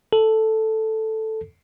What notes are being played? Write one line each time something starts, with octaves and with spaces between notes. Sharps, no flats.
A4